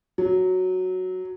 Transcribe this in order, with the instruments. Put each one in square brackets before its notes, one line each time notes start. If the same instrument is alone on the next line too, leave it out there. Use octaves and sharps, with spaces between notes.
[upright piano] F#3